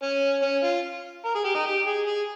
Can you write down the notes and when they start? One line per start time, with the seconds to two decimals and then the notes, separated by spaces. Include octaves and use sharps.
0.03 C#4
0.42 C#4
0.63 F4
1.25 A#4
1.35 G#4
1.45 G4
1.55 D#4
1.66 G4
1.86 G#4
2.06 G#4